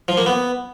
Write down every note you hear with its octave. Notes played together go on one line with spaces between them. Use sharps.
F3
A#3
B3